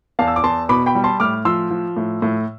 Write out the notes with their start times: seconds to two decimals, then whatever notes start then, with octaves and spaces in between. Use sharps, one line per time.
0.19 E2 F5 A5
0.28 E6
0.36 D6
0.44 E2 A5 C6
0.69 B2 B5 D6
0.86 G5 B5
0.95 G3
1.04 A5 C6
1.20 A2 D6 F6
1.45 F3 C6 E6
1.71 F3
1.97 A2
2.22 A2